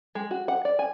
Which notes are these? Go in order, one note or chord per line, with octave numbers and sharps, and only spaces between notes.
G#3
F#4
F#5
D5
G#5